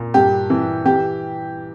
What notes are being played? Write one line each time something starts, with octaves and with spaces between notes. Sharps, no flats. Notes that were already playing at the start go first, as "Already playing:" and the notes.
Already playing: A#2
G2 G4
E3
E3 G4